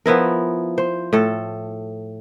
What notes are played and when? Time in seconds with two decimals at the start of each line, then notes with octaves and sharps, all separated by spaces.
0.06 F3 B3 E4 A#4
0.78 C5
1.13 A2 A4